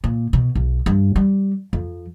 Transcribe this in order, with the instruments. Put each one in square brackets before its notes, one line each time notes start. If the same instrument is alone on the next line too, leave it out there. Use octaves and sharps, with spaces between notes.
[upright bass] A#2
B2
B1
G2
G3
F2